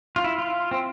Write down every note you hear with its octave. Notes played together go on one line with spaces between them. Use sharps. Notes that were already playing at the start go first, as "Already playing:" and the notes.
F4
E4
F4
C4